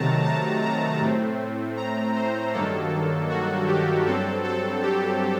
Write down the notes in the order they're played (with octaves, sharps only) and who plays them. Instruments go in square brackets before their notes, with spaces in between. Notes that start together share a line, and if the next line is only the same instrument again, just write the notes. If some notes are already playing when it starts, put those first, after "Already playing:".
Already playing: [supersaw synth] C3 D#3 F#3 A3 A5 A#5
A5
A#5
A2 A3 C4
A#5
C5
G2 D#3 F#3 A#3 A4
F#4
G4
G2 F#3 C4 A4
A4
G4